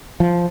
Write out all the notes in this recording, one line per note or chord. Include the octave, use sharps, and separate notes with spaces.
F3